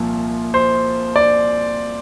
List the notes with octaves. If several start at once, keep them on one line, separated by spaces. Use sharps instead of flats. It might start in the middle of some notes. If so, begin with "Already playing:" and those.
Already playing: C2 A#2 F3
C5
D5